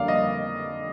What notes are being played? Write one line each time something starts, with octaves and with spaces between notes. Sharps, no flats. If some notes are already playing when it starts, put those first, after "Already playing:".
Already playing: F2 D3 G3 A#3 D5 F5
D#5